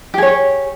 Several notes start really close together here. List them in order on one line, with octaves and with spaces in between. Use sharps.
G4 G#4 C#5